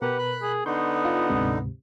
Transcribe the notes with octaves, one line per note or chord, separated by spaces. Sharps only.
B2 G4 A#4 B4 F#5
B5 F#6
G#4
D3 B3 D#4 C6 C#6 G6
F4
D2 G#2 C3